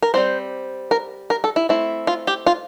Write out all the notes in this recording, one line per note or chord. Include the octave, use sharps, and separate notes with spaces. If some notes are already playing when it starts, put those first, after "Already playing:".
A#4
G3 C4 E4 C5
A#4
A#4
A4
E4
A3 C4 E4
F4
G4
F4